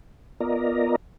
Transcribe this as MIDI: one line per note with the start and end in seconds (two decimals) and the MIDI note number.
0.40 0.96 59
0.40 0.96 65
0.40 0.96 70
0.40 0.96 74
0.40 0.96 75
0.40 0.96 82